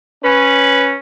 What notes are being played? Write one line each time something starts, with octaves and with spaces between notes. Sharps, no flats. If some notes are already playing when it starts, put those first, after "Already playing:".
C#4 B4